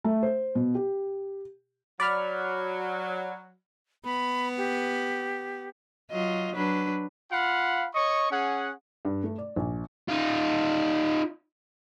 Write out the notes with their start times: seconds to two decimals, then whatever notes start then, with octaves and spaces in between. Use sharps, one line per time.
0.04 A3
0.23 C5
0.55 B2
0.75 G4
2.00 F#3 D5 B5 F6
4.05 B3 B5
4.58 G4
6.11 F#3 F4 D#5
6.55 F#3 D4 B4
7.32 F4 F5 F#5 B5
7.95 C#5 D#5 C#6
8.31 C#4 G#4 F#5
9.05 G2
9.24 A3
9.38 D5
9.56 A#1
10.08 D#4 F4